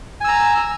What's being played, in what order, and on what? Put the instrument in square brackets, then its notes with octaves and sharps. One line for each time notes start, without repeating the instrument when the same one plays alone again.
[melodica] G#5
E6
A#5